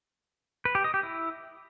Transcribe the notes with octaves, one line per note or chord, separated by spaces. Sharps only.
B4
G4
D#5
G4
E4